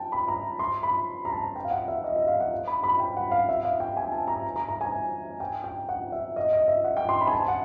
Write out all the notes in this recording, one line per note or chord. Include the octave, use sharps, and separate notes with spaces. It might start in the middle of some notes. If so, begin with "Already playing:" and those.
Already playing: G5 A5
B5
A#5
C6
B5
A#5
A5
G5
F5
F#5
E5
D#5
E5
F5
F#5
B5
B5
G5
F#5
F5
E5
F5
G5
G#5
A5
A#5
A#5
A#5
G#5
G5
G5
F#5
E5
D#5
D#5
E5
F#5
G5
C6
B5
G#5
A5
F#5